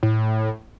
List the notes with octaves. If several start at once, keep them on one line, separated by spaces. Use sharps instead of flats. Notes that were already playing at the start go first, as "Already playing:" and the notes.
A2